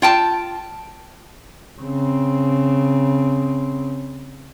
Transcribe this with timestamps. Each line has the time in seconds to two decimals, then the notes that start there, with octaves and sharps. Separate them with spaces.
0.02 F4 G5 A5
1.81 C#3 C4